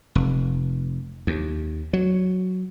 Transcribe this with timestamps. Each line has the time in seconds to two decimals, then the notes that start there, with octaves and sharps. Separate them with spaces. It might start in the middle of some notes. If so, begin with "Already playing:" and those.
0.15 F1
1.27 D#2
1.93 F#3